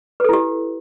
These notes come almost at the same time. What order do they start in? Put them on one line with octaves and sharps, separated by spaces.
B4 A4 E4 G4